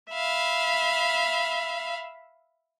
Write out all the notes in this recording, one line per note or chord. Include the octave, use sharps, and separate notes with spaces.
E5 F5 B5